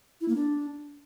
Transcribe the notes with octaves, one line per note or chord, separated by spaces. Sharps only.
E4
A#3
D4